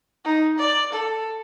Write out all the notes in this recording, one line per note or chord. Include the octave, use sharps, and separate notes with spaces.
D#4
D5
A4